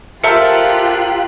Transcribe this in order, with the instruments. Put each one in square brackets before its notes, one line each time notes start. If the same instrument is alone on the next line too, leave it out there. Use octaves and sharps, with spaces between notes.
[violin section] F4 G4 F#6 [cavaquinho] A4 A#4 C5 [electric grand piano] E5 C#7